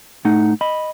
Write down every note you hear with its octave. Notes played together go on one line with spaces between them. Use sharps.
A2 A3 D#4 F#5
D#5 B5